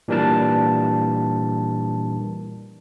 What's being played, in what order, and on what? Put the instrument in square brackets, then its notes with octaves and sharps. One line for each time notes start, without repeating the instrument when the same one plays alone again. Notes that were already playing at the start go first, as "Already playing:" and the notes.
[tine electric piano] A#2 E3 G3 D4 A#4 A5